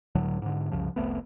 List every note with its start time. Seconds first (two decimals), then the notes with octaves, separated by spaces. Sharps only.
0.15 C#2 A2 D3 F#3
0.42 G#2 D3
0.71 C2 F#2 C#3 F3
0.96 F1 C2 A3 B3